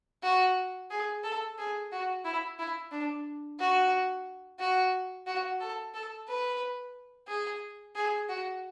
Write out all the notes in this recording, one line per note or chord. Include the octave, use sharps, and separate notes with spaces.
F#4
G#4
A4
G#4
F#4
E4
E4
D4
F#4
F#4
F#4
A4
A4
B4
G#4
G#4
F#4